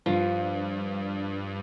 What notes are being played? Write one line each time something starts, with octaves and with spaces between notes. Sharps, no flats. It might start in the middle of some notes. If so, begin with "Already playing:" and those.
G2 F3